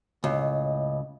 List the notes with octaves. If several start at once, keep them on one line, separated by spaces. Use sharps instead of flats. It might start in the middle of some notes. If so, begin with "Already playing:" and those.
C#2 A2 D#5